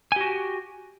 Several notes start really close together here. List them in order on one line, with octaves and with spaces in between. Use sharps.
G#5 G4 F#4